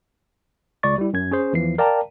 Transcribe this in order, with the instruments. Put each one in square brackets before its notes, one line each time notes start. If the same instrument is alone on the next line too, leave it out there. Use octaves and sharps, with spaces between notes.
[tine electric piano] C#2 D5 C#6 A6
G3 E4
F#2 G#6
C#4 G#4 C5
E2 E3 F3 C7
A#4 D5 F5 G5 A5 A#5